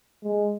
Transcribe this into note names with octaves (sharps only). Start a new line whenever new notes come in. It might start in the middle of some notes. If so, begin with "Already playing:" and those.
G#3